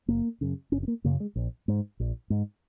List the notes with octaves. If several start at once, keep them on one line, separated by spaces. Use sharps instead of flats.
F#1 A#3
F#2 C#3
F#1 C#4
C#4
A#3
F#2 C#3 A#3
G#3
A#1
G#2
A#1
G#2